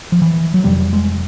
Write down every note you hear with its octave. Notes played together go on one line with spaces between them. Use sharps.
F3
E3
F#3
F1 F2 C3 G3
G#3